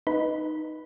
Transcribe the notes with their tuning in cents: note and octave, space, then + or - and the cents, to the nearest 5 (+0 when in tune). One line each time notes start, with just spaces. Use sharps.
D#4 +0 B4 +0